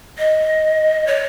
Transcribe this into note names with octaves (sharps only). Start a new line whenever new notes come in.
D#5
C#5